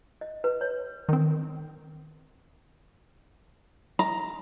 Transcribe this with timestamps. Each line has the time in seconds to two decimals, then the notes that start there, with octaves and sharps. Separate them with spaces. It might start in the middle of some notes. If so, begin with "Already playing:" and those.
0.21 D#5
0.44 B4
0.61 C#5
1.09 D#3 C4
3.99 A#5